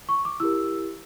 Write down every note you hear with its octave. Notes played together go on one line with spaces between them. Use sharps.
C#6
D6
E4 G4 A#4 E6